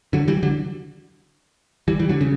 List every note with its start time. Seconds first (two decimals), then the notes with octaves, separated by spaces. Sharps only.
0.13 D3 F#3
0.28 E3 G3
0.43 D3 F#3
1.88 E3 G3
1.99 E3 G3
2.09 D3 F#3
2.21 C#3